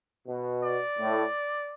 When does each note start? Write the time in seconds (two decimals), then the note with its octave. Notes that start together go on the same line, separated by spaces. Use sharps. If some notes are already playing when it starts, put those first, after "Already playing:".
0.27 B2
0.63 D5
0.98 A2